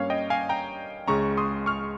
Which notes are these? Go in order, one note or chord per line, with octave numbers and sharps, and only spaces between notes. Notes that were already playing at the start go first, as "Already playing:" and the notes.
Already playing: G2 G3 A#3 C#4 C#5 F5
D#5 G5
F5 G#5
G5 A#5
C#2 C#3 G#3 C#4 A#5 C#6
C6 D#6
C#6 F6